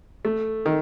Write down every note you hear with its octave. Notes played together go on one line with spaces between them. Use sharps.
A3
D#3